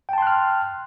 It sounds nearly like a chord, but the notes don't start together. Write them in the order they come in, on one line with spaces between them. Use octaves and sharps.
G5 A5 C6 F#6 F6